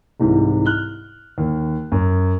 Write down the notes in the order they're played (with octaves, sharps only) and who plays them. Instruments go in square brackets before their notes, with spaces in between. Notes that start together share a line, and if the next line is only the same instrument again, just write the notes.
[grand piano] C2 G#2 C3 E3
F6 F#6 G7
D#2
F#2